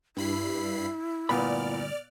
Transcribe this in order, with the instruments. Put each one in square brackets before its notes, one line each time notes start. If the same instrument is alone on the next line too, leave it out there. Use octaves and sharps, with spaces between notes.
[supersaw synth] G2 B5 C7 [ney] E4
[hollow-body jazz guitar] D2 G2 B5 [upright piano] A#2 B3 [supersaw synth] D5 F6